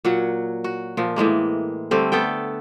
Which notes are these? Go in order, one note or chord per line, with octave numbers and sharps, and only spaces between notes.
A#2 F#3 F#5
F#4
A#2 F3
A2 E3 G#3 A#3
D3 G3 A3 C4
A3 B3 A4 G5